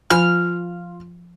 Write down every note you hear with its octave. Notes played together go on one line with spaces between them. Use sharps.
F3 F4 G#5 B5 F6